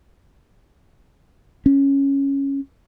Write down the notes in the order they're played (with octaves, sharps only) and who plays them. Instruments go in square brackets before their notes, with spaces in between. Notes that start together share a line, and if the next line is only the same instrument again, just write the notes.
[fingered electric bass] C#4